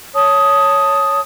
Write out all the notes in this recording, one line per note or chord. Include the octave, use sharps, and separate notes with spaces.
C#5 A5 D#6